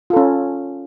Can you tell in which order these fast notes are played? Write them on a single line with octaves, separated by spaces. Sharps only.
F4 A4 C#4